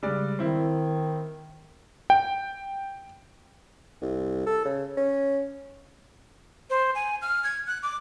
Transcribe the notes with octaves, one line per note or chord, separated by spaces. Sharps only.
C#3 G3 G#3 D5
D#3 C4 E4
G5
C2
A4
C#3
C#4
C5
G#5
F6
G#6
F#6
D6